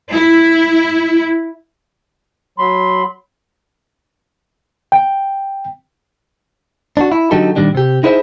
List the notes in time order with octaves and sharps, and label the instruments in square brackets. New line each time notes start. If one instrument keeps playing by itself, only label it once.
[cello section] E4
[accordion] F#3 B5 C6
[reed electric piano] G5
[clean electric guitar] D4 F#4
E4
D3 F#3 D#4 G4 A4
A#2 D#3 G3 D4
C3 G4
D#4 E4 G#4 C5 D5 E5